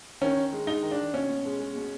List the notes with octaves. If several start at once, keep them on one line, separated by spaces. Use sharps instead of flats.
D#3 C#4
D#3
G#3
G#3 D#4
D#3
D4
D#3
B2 C#4
B2
G#3
G#3
B2